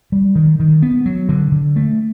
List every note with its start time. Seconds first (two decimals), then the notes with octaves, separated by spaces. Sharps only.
0.12 G3
0.36 D#3
0.60 D#3
0.82 B3
1.06 F#3
1.29 D3
1.52 D3
1.76 A3